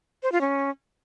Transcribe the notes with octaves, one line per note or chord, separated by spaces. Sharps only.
C5
F4
C#4